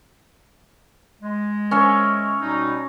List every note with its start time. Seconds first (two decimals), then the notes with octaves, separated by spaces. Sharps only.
1.22 G#3
1.71 C#4 C#5 E5
2.42 B2 G3 D#4